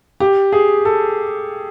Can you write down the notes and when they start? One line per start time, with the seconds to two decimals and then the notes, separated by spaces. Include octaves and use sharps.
0.20 G4
0.52 G#4
0.85 A4